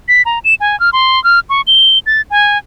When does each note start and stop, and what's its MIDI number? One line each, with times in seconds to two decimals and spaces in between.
0.08 0.22 95
0.25 0.39 82
0.45 0.54 100
0.60 0.79 80
0.80 0.90 89
0.93 1.22 84
1.24 1.40 89
1.50 1.61 85
1.67 1.99 103
2.06 2.22 93
2.30 2.58 80